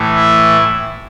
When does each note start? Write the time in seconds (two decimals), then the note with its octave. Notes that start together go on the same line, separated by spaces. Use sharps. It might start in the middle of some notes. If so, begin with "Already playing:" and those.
Already playing: A2 E3 A3
0.15 E4